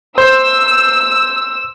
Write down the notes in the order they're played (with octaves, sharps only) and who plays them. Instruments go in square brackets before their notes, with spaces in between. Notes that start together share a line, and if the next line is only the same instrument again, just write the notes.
[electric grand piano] C5 [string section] E6